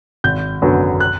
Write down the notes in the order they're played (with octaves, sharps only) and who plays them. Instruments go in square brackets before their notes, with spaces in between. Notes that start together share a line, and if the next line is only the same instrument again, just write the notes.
[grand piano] G#1 G6
F#2 D3 F#3 B3
F#6